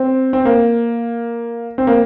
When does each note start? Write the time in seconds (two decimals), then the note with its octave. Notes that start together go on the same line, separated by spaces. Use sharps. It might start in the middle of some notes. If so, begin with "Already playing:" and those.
Already playing: C4
0.33 C4
0.45 A#3
1.78 C4
1.87 A#3